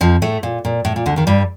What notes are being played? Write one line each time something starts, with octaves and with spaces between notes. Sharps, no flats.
F2 F3
A2 A3
A#2
A#2
A2
A#2
D2 D3
D#2 D#3
G2 G3